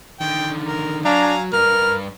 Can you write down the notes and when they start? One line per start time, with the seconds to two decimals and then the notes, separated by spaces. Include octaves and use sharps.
0.21 D3 D#3 G5
0.67 A#4
1.05 F#3 D4 F5 G#5 A#5
1.53 G2 A#4 F6